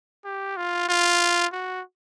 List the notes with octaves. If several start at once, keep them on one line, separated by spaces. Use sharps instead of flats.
G4
F4
F4
F#4